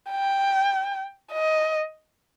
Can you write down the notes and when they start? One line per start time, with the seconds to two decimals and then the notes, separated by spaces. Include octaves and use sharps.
0.11 G5
1.32 D#5